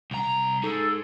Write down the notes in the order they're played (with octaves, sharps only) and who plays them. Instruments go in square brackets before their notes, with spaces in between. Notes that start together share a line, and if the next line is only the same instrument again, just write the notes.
[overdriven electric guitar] C2 A#5
[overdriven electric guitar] D#4 G#4 [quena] A4